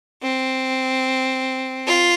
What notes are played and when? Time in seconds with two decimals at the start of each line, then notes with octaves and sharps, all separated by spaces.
0.23 C4
1.86 F4